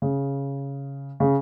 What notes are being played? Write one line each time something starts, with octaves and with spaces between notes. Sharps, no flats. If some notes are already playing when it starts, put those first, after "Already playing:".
C#3
C#3